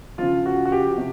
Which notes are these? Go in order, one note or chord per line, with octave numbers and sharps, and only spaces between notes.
C#3 F3 F4
F#4
F#4
G4
C3